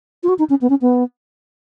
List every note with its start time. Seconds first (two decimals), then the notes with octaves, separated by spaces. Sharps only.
0.23 F4
0.29 F#4
0.39 D#4
0.50 C#4
0.61 B3
0.70 C#4
0.81 B3